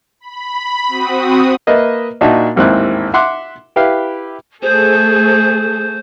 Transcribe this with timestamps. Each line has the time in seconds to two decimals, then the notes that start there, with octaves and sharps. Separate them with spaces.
0.20 B5
0.88 C4 F#4 D#6
1.67 A#3 B4 D#5 E5
2.21 A#2 D4 D#4 F#4 E5 A5
2.56 A1 D#2 G#2 C4 E4 F#6
3.14 E5 F#5 C6 D6 F#6
3.76 E4 G4 B4 E5 F5
4.63 A3 G#4 A4 C5